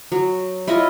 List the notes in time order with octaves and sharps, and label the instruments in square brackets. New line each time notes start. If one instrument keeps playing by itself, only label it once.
[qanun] F#3
E4 F4 C#5 D#5